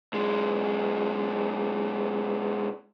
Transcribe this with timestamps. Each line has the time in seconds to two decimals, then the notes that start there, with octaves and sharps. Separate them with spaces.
0.13 B1 G#3